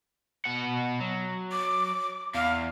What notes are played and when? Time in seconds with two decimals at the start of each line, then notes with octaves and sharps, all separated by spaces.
0.45 B2 F#5
1.00 F#3
1.52 D6
2.35 E2 F5